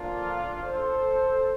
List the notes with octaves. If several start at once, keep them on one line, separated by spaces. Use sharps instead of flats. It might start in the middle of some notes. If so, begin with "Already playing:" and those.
Already playing: D3 F3 A#3 D4 F4
A4 C5